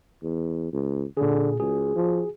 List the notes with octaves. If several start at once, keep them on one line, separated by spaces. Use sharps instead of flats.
E2
C#2
A#2 D3 G#4
C#2 F#4 G#4
F3